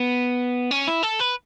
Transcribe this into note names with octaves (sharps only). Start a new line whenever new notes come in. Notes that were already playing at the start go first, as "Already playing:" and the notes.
Already playing: B3
C#4
E4
A4
B4